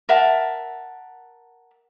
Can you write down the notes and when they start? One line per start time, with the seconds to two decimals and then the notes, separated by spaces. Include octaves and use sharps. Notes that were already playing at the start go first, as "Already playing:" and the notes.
0.09 A#4 E5 F#5 A5